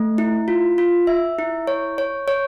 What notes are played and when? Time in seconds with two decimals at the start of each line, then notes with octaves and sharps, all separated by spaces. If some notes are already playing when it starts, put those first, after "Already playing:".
Already playing: A3
0.18 E4
0.48 F4
0.78 F4
1.07 E5
1.39 E4
1.67 C#5
1.98 C#5
2.28 C#5